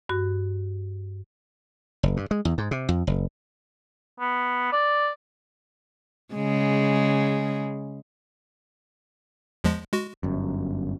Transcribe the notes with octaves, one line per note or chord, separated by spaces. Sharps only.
G2 F#4
F#1
G2
G#3
E2
G#2
C3
F2
F#1
B3
D5
C#3 G#3
E2 F3 G#3
G#3 F#4
G1 F#2